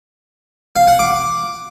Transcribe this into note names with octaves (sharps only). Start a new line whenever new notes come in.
F5
F#5
D6